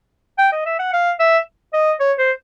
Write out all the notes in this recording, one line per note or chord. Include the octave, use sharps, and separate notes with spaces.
G5
D#5
E5
F#5
F5
E5
D#5
C#5
C5